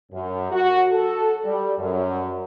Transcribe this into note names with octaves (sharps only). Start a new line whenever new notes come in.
F#2
F#4
A4
G3
F#2